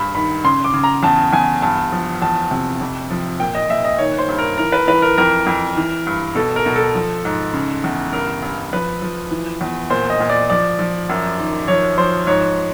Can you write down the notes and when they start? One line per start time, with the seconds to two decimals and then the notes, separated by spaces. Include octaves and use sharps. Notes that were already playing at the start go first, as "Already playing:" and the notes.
Already playing: G2 B5
0.15 D#3 B5
0.44 C#3 C6
0.64 D6
0.74 C#3
0.84 A#5
1.03 E2 A5
1.33 E2 G#5
1.62 G2 A5
1.92 F3
2.22 E2 A5
2.51 C3
2.81 F2
3.10 F3
3.40 A#2 G5
3.55 D#5
3.70 A#2 E5
3.84 D#5
3.98 D#3 C#5
4.18 C5
4.28 G2
4.38 A#4
4.58 E3 A#4
4.72 B4
4.87 E3 B4
5.02 A#4
5.17 F2 A#4
5.46 F2
5.77 E3
6.07 G2
6.35 B2 A4
6.56 A#4
6.66 B2
6.76 A4
6.95 F3
7.25 G#2
7.53 C#3
7.84 E2
8.13 G2 A#4
8.42 G2
8.73 F3 B4
9.02 F3
9.31 E3
9.61 E2
9.90 A#2 C5
10.10 D#5
10.20 A#2
10.29 D5
10.50 F3 D5
10.79 F3
11.09 F#2
11.38 D#3
11.68 F3 C#5
11.98 F3 C5
12.27 G#2 C#5